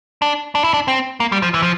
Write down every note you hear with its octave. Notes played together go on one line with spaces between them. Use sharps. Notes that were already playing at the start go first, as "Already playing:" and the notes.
D4
D4
E4
D4
C4
A#3
G3
F3
E3
F3